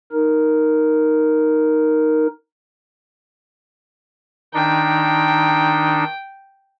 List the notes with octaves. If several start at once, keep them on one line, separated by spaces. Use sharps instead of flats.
D#4 A#4
D#3 D4 D#4 G5